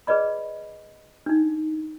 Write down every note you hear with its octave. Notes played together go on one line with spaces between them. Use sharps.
G#4 B4 D5 D#5 B5
D4 D#4